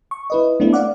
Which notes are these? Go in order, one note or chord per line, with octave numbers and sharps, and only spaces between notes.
C#6
E4 B4 D#5
A3 B3 C4 D4 E4
D5 F5 F#5 D6